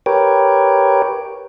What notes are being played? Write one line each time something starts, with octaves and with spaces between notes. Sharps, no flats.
G4 A#4 B4 C#5 G5